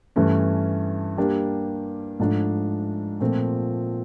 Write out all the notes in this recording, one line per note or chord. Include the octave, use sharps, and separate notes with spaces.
G2 E3 A3 C#4
G3 A#3 D4 G4
G#2 F3 A3 D4
A#2 F3 A3 C4